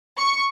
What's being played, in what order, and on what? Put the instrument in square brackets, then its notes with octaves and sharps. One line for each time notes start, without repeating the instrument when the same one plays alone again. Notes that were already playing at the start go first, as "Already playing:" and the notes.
[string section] C#6